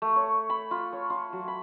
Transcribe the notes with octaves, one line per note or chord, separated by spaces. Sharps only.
A3
C#5
B5
F4
C#5
F4
F#3
B5